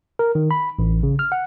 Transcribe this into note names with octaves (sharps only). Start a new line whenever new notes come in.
A#4
D#3
B5
A1
C#3
F6
F#5